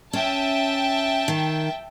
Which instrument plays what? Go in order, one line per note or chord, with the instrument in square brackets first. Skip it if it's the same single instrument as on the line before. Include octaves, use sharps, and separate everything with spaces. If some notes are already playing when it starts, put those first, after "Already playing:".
[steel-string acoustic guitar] C#4 [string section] E5 G5 A5
[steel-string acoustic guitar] D#3